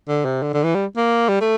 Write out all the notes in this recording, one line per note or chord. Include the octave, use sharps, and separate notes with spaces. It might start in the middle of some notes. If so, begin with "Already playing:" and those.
D3
C3
D3
D3
E3
G3
A#3
G3
A3